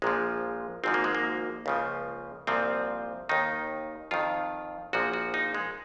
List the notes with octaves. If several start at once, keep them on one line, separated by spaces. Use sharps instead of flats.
A#1 A#2 F3 G#3
G#1 G#2 F3 C4
A#3
G#3
A#3
C#2 C#3 F3
C2 A#2 F3 C4
D#2 D#3 D#4
F2 D#3 F4
A#1 A#2 F3 F#4
F#4
D#4
G#3